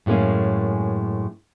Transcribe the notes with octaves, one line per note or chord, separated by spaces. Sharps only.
F#2 A2 G#3 A#3 C#4